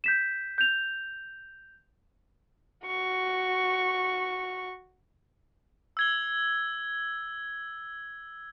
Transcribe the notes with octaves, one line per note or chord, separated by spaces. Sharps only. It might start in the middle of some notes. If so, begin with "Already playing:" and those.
G6 B6 E7
G6 F7
F#4 C#6
E6 G#6 G7